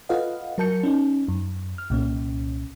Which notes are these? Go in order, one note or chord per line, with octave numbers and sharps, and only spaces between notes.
F4 A4 B4 D#5 F5 F#5
F#3 A#4 A5 G6 C#7
C#4 D#4
F#2
F6
C2 A#2 C#4